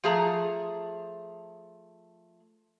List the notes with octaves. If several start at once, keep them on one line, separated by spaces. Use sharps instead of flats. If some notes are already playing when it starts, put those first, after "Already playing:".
F3 A3 G#4 A5 A#5